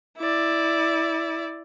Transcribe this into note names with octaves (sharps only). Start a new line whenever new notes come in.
E4 D5